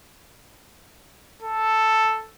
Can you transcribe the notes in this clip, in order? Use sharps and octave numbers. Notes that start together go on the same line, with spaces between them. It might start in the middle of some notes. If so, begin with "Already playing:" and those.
A4